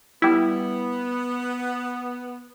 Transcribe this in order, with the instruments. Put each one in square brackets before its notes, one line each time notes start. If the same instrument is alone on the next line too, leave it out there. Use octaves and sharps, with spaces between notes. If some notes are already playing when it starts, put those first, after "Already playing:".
[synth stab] G3 E4 [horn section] B3